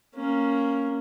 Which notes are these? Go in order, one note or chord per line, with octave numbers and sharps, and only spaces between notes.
A#3 C#4